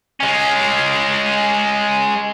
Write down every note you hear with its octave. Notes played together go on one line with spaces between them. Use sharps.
G#3 C#4